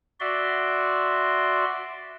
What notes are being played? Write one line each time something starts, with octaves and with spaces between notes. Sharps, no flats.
F#4 D5 E5 C6